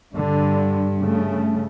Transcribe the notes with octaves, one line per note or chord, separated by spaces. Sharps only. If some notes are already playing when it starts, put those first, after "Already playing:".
G2 D3
C#3 A3